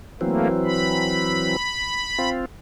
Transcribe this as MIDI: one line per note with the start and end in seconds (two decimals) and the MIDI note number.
0.21 1.56 52
0.21 1.56 54
0.21 0.48 57
0.21 0.48 58
0.21 1.56 60
0.65 2.30 83
2.19 2.45 60
2.19 2.45 65